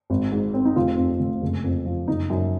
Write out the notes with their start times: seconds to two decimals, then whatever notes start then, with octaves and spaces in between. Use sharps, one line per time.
0.10 G#1
0.32 G#2
0.54 C4
0.65 D#4
0.76 F1 F4
0.97 F2
1.20 F1
1.42 F#1
1.64 F2
1.86 F3
2.08 F#1 D#4
2.30 F#2